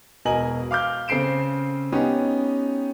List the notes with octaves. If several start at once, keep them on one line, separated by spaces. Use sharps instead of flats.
E1 B2 A#4 D#5 G#5 F#7
F5 D6 F6 G6
C#3 C4 A4 C7 D7 E7
B3 C#4 D#4 G4